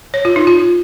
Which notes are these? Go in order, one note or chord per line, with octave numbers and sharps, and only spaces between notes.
C#5
F4
D#4
F4